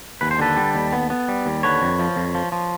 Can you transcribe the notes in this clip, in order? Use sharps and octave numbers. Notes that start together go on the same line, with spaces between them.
D#2 B4
C5
D3 A4 B4
G3
D#2
B3
B3
G3
D#2
D3 B4 C#5
F2
F3
F2
F3
F3